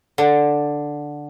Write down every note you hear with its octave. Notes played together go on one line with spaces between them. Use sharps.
D3